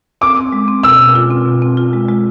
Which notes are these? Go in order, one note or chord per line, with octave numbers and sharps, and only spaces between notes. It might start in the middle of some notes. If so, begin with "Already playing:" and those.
C4 D6
C4
G#3
C4
B2 E6
B2
F4
C4
B2
C4
F4
G#3
G#3